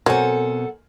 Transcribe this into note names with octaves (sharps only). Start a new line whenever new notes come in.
B2 F#3 C4 A4 A#4 C5 F#5 G#5